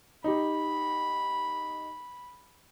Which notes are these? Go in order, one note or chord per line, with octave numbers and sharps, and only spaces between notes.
D#4 G4 B5